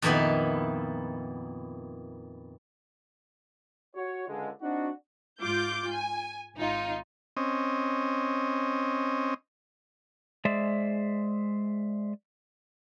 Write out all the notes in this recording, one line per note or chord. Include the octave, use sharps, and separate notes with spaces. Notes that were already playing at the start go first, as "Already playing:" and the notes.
F2 A#2 D#3 B3 D#4 E4
F#4 C#5
C#2 D3 G#3
C4 D4 D#4 F#4
G#2 F4 D6 G6
G#5
G#1 D#4 F4
C4 C#4 D#5
G#3 G#4 C5 D5 E5